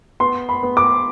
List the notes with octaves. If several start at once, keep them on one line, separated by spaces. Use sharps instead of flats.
B3 C6
B5
B3
D6